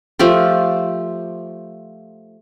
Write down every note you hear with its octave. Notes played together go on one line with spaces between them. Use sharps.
F3 A3 G4 C5